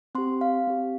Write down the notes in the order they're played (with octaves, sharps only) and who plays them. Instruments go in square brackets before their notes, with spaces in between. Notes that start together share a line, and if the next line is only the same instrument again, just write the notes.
[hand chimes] C4 G4 C6
F5
C4 G4